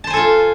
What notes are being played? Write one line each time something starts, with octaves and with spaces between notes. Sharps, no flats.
F4 A4 C5 G#5 A5